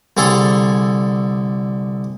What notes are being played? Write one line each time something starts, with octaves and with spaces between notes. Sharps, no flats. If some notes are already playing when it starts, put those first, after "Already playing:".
C2 D3 G#4 A4 C#5